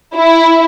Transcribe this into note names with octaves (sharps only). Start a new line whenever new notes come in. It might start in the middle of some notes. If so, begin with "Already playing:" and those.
E4